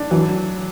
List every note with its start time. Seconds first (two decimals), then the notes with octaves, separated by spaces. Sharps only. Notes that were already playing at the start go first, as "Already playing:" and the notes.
Already playing: D4
0.11 E3 F#3